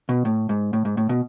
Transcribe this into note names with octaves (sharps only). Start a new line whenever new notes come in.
B2
A2
G#2
A2
G#2
A2
B2